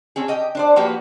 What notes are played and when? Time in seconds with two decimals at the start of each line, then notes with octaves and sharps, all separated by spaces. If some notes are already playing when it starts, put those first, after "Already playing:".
0.16 C4 C#4 G#4
0.28 G4 D#5 G5
0.55 D4 C5 D5
0.76 F3 A#3 F#4 G4 B4